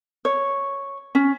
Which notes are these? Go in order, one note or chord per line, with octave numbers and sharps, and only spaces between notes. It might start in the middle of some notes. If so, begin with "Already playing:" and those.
C#5
C#4